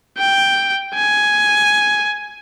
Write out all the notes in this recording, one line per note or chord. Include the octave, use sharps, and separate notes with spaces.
G5
G#5